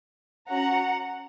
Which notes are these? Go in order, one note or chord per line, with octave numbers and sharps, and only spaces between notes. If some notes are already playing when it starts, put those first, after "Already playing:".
C#4 F#4 F#5 A#5